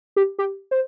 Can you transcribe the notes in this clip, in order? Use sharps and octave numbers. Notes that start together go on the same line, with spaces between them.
G4
G4
C5